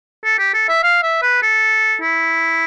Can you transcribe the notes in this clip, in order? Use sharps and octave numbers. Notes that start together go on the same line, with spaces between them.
A4
G4
A4
E5
F5
E5
B4
A4
E4